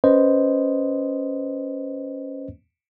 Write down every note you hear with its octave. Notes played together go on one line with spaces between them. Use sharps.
C#4 B4 C5 D#5